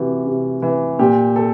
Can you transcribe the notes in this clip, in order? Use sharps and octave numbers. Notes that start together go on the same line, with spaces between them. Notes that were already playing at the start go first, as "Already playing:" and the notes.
Already playing: C3 E3 F#4
C3
E3
A#2 G4
A4